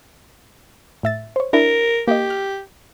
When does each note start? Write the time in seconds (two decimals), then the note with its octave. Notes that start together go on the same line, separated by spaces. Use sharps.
1.03 A2 E5 A6
1.36 C5 C#5
1.53 D4 E4 A#4
2.08 A#3 G4 D#5
2.30 F6